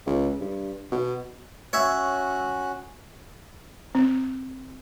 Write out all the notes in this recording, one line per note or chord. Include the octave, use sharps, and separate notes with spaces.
C#2
G2
B2
C#4 F#4 C#5 E5 F#6
C4